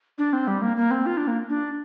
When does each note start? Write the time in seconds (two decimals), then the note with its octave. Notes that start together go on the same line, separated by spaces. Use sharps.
0.18 D4
0.33 C4
0.47 G3
0.62 A#3
0.77 A#3
0.91 C4
1.06 F4
1.17 D4
1.28 A#3
1.49 D4